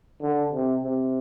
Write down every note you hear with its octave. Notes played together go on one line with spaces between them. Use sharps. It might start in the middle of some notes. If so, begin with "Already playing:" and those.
D3
C3
C3